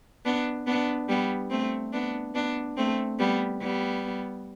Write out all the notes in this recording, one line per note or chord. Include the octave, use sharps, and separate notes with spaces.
B3 D4
B3 D4
G3 B3
A3 C4
B3 D4
B3 D4
A3 C4
G3 B3
G3 B3